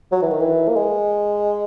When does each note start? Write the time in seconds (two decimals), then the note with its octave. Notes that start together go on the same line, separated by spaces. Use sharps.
0.12 F#3
0.22 E3
0.31 D#3
0.40 E3
0.69 A#3
0.76 G#3